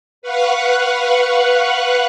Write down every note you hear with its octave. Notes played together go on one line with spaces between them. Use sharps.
B4 F5 F#5 C#6 F#6